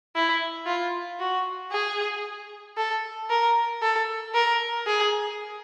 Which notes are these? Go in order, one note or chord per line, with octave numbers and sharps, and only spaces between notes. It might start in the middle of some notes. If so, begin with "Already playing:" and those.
E4
F4
F#4
G#4
A4
A#4
A4
A#4
G#4